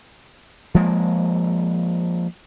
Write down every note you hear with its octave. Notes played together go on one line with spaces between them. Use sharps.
F3 G#3 A#3